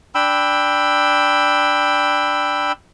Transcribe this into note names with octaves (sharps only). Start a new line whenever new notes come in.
D4 G5 B5 E6